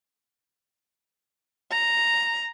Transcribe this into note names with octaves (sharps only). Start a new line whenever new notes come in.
A#5